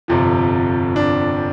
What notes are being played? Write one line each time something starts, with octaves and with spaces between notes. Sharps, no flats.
G1 F2 C3 F3
D4